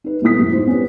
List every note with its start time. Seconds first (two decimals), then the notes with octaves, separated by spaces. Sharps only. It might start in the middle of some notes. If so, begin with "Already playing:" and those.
0.04 D#4 B4
0.22 C2 B2 A3 E4 D#6 B6
0.38 F#2 A2
0.51 D#4 E4 C5
0.67 B3 C#4 G4 B4